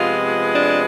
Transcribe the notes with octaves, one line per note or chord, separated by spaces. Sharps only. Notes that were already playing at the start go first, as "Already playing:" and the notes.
Already playing: C3 F3 G#3 B3 F4
D4